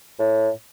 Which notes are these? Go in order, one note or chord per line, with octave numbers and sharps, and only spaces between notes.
A2